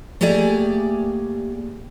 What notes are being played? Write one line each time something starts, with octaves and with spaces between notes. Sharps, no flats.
A3 A#3 G4 G#4 D5 G#5